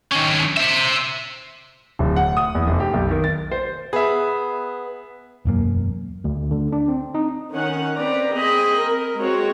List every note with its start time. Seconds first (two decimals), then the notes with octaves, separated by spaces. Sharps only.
0.11 D#3 C#4
0.57 C5 E5
1.99 D1
2.16 F#5
2.37 D#6
2.55 E2
2.67 F1
2.80 G4
2.93 B1
3.11 D#3
3.24 A6
3.52 C5
3.93 B3 G#4 E5
5.45 E1 F#2 A#3
6.24 D2
6.51 D3
6.73 D4
6.88 C4
7.15 D#4
7.53 D#3 C#4 F#5
7.97 C4 B4 D5 A#5
8.33 C4 G#4 D#5 B5
8.79 A#4
9.17 G#3 C4 F#4 C#5